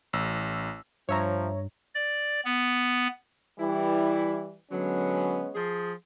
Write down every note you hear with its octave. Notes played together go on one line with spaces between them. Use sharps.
A1 E6
G2 F3 C#5 E5 A#5
D5
B3
E3 G3 E4
D3 F#3 G#3 B3 C#4
F3 G#4